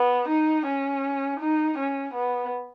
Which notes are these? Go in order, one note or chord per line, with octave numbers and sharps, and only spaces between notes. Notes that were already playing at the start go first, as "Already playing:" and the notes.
Already playing: B3
D#4
C#4
D#4
C#4
B3